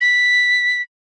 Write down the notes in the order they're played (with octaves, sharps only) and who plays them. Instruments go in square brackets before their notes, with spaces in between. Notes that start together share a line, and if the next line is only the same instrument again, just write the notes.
[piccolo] B6